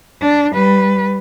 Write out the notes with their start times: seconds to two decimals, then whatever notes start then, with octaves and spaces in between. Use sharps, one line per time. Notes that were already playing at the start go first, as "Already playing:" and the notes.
0.22 D4
0.54 G3 B4